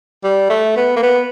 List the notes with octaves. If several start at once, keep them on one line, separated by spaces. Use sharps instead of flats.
G3
A3
B3
A#3
B3